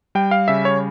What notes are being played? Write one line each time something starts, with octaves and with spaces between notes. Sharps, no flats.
G3 G5
F5
C#3 E5
C#5